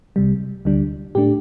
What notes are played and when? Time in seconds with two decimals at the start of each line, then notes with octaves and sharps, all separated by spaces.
0.16 C2 C3 G3
0.65 D2 D3 G3 D4
1.15 A2 A3 D4 G4